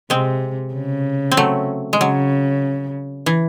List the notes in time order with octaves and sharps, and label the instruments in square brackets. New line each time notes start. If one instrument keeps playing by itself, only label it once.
[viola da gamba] C3 [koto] G#3 C4
[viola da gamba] C#3
[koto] C4
F#3 A3
G#3
[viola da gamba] C#3 [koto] F#3
[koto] E3